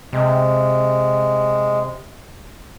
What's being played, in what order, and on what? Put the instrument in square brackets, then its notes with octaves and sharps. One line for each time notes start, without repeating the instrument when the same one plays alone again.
[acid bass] C3 [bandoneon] G#3